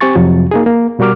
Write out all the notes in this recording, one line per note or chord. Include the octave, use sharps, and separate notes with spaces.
C4 G4 G#5 C#6 A6
F2 C3 F3 F#3
A#3 D#4 G#4
A#3
B2 G3 F#4 A#4 D6 F6